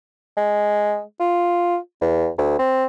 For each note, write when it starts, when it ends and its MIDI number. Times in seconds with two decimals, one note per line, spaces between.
0.37 1.01 56
1.20 1.77 65
2.01 2.28 40
2.38 2.56 38
2.59 2.86 60